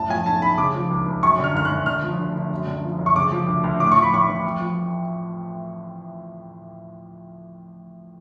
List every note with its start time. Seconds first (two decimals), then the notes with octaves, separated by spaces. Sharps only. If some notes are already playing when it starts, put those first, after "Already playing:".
Already playing: F#1 A2 A5
0.09 F3 G#5
0.26 B1 A5
0.42 B1 B5
0.57 C#3 D6
0.74 F3
0.90 C#2
1.06 C#2
1.23 F#2 C#6
1.39 D3
1.44 F6
1.54 G#1 F6
1.65 F#6
1.71 G#1
1.86 D3 F6
2.03 F3
2.18 D2
2.36 D2
2.50 F#2
2.67 D3
2.84 F3
2.99 F#1
3.06 C#6
3.15 C#3 D6
3.32 F3
3.47 D2
3.64 D2
3.79 A2 D6
3.92 F3 C#6
4.02 B5
4.12 A1 C#6
4.28 A1
4.44 F2
4.60 F3